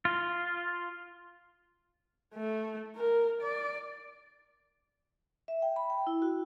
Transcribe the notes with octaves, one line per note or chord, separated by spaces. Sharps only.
F4
A3
A#4
D5
E5
G5
B5
G5
E4
F#4